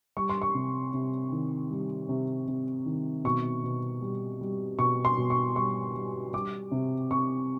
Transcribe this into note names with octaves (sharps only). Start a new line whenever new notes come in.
G3 C#6
C6
C#6
C3
C3
D#3
G3
C3
C3
D#3
B2 C#6
B2
G3
G3
B2 C#6
C6
B2
C#6
G3 C#6
G3
G3 D6
C3
C3 C#6